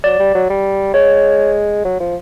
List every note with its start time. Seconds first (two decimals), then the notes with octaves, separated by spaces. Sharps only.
0.04 F#3 D5
0.19 G3
0.35 F#3
0.50 G3
0.94 G#3 C#5
1.85 F#3
2.00 F3